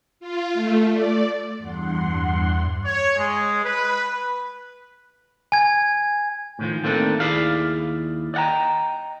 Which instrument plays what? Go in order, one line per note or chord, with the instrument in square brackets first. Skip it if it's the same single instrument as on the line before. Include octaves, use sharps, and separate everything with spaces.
[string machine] F4
A3
D5
E2 G2 F#5 C6
[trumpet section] C#5
G#3
B4
[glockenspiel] G#5 G#6
[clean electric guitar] A2 D#3 F3
D#3 A3 A#3 C4 D4
D#2 E4 G#4 D5 F5
D5 D#5 F#5 G5 A#5